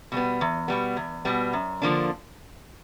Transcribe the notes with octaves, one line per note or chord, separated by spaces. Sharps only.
B2 G3 B3
E2
B2 G3 B3
E2
B2 G3 B3
F#2
D3 F3 A#3 D4